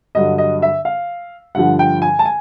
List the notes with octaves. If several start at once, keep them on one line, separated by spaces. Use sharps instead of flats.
G2 D3 F#3 D#5
D#5
E5
F5
G2 D3 F3 F#5
G5
G#5
A5
G#5